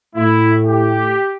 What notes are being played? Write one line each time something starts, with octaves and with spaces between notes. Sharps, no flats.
A2 A3 E4
G4